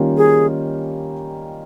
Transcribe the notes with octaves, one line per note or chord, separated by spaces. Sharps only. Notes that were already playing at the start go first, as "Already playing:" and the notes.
Already playing: D#3 G3 A#3 C#4 F4
G#4